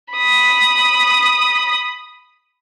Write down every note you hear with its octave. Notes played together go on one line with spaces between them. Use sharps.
B5 D#6